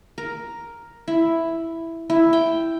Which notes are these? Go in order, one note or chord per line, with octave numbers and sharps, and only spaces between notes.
A#4
E4
E4
G5